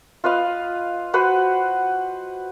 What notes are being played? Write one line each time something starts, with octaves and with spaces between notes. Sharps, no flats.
F4 B4 D#5 F5
F#4 B4 C5 F#5